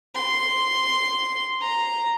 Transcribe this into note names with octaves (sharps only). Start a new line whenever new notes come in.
C6
A#5